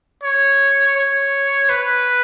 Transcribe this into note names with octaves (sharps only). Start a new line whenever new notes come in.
C#5
C#5
B4